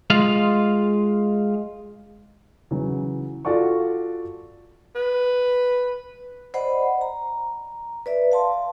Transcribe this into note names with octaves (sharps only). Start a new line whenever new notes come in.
G#3 F4 F5
C#3 E3 F#3
F4 F#4 A4 D5 F#5 C#6
B4
C5 D5 D#5 F#5 B5
A#5
B4 D5 E5
F5 A5 C6